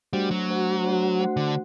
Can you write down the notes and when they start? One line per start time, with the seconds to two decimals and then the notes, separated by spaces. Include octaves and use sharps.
0.13 G3 A3 D4 F#4 C5 F#5
0.31 F#3
0.48 A3 D4 F#4 C5 F#5
0.84 A3 D4 F#4 C5 F#5
1.19 A3 D4 F#4 C5 F#5
1.37 D3